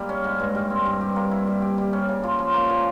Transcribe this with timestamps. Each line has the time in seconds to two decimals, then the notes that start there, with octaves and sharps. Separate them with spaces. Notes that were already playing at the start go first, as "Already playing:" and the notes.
Already playing: G3 A#3 E4
0.09 C#4
0.24 G#2
0.40 G2
0.55 G3
0.70 C4
0.85 G2
1.01 G4
1.16 A#3
1.31 E4
1.47 G3
1.62 G4
1.78 G3
1.93 C#4
2.09 C#3
2.23 F4
2.39 F3
2.54 A#3
2.69 A#2